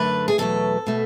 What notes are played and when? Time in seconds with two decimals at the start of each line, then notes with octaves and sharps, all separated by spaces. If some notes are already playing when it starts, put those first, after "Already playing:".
Already playing: F#2 D3 A3 B4
0.28 G#4
0.38 E2 B2 F#3 A3 A4
0.87 B2 A3